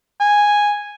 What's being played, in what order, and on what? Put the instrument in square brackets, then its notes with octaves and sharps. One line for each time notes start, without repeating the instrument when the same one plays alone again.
[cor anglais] G#5